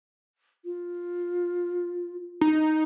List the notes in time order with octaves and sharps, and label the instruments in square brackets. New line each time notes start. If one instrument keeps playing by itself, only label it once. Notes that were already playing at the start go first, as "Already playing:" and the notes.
[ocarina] F4
[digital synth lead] D#4